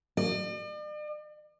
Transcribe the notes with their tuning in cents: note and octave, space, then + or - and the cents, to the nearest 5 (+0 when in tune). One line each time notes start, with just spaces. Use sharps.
D5 +45